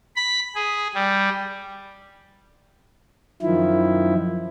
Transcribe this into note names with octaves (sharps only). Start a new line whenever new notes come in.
B5
G#4
G3
F#2 D#3 F3 E4